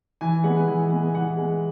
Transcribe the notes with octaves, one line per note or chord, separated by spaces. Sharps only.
E3 G#5
G#3 B3 F#5
E3
G#3 B3
E3 F#5
G#3 B3